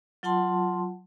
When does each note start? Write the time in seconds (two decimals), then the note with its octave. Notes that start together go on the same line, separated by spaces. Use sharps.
0.23 F#3 F4 F#5 A5 C6